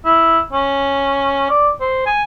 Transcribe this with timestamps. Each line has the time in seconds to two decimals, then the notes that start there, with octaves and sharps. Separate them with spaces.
0.05 E4
0.53 C#4
1.50 D5
1.80 C5
2.06 G#5